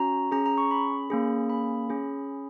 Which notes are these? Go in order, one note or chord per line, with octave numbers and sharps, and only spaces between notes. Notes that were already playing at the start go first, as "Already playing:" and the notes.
Already playing: C#4 F#4 A#5
C#4 G#4 A#5
A#5
C#6
B5
A#3 C#4 G#4
B5
C#4 G#4